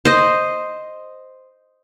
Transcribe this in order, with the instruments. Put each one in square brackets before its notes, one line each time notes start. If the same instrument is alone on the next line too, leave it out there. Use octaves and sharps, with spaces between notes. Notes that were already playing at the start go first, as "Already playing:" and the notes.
[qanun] C5 D#5